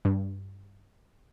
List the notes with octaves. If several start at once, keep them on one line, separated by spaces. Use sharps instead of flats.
G2